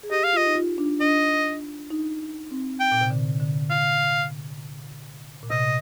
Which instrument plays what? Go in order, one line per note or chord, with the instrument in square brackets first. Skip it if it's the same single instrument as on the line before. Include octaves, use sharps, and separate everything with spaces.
[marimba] G#4
[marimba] G4 [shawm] D#5
[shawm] F5
[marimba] F4 [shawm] D#5
[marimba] D#4
F4
D4
[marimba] D4 [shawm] D#5
[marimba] D#4
C4
[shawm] G5
[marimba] A#2
C3
D3
D3
[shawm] F5
[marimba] A#2
[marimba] C3 [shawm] D#5